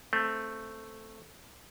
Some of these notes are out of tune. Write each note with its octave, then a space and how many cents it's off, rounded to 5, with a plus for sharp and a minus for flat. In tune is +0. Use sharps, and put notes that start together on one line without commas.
A3 +0 C4 +0